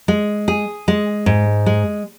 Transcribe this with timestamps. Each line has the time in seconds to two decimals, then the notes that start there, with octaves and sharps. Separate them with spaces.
0.08 G#3
0.48 G#4
0.88 G#3
1.26 G#2
1.66 G#3